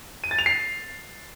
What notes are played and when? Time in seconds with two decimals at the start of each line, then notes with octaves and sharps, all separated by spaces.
0.24 D#7
0.31 A6
0.39 F7
0.46 C7